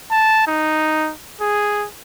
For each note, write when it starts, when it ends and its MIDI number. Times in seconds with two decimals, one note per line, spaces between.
0.11 0.47 81
0.47 1.11 63
1.41 1.87 68